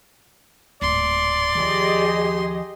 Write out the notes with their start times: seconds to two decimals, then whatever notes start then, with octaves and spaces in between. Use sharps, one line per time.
0.82 D1 G#2 D5 C6
1.55 D#2 F3 G4 G#4 D#5